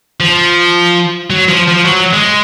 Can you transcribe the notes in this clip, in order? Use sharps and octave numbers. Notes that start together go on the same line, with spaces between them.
F3
F#3
F3
F3
F#3
G#3